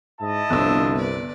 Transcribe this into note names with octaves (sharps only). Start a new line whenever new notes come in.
G#2 E4 D#5 A5
G1 C2 F3 D4 E6
B4 D5